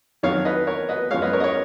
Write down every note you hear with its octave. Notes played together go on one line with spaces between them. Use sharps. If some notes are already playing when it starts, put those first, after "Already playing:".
F2 D#3 F#3 C#5 F5
B4 D#5
A#4 C#5
B4 D#5
F#2 F3 G#3 C#5 F5
B4 D#5
A#4 C#5
D#5
A#4 C#5